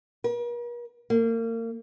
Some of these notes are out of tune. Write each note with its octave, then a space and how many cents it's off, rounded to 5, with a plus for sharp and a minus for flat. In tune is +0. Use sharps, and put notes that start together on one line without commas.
A#4 +45
A#3 -35